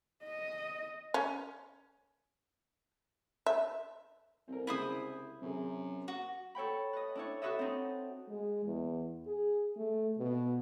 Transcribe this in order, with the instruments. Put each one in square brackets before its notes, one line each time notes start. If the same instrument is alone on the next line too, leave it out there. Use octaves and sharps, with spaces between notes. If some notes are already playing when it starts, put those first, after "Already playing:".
[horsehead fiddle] D#5
[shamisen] C#4
E5
[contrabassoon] C2 [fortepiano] C4 A#4
[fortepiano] C#3 G#3 [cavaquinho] E4 C5 D#6
[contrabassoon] F#2 [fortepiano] C3 C4 G#4
[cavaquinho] F#4
[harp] A4 C#5 G5 B5
B4 D#5
D4 E4 C#5
F#4 A4 B4 C#5 D#5 E5
C4 D#4
[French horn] G#3
E2
G#4
A3
B2